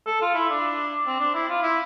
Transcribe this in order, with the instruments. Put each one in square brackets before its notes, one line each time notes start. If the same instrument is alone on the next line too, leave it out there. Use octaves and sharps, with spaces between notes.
[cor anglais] A4
F4
E4
D4
C4
D4
E4
F4
E4